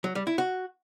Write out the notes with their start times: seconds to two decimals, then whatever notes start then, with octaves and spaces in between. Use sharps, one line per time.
0.04 F#3
0.15 G3
0.27 E4
0.38 F#4